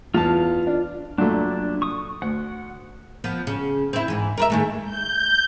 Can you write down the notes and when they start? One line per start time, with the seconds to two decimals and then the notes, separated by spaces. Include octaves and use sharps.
0.14 E2 F4 F5 A5
0.67 D4
1.18 F#2 A#2 A3 D4
1.82 C#6 D#6
2.22 D2 F#5
3.24 F3 B3
3.47 C#3
3.93 C4 E4
4.08 G#2 E3
4.37 A#4 B4 E5
4.50 D#3 G#3 A3
4.85 G6